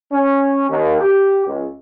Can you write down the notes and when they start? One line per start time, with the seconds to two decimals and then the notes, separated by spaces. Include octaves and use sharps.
0.13 C#4
0.69 D#2
1.01 G4
1.47 C#2